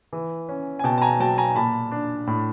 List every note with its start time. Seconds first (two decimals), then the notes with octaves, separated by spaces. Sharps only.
0.13 E3
0.49 C#4
0.79 G#5
0.84 B2 G5 A5
0.98 A5
1.02 G#5 A#5
1.20 F#3 G5 A5
1.38 G#5 A#5
1.55 A#2 A5 B5
1.91 D4
2.27 A2